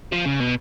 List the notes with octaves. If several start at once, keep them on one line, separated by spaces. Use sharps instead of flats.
F3
C#3
B2